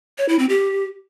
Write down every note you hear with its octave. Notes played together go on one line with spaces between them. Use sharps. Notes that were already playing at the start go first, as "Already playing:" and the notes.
C#5
E4
C4
G4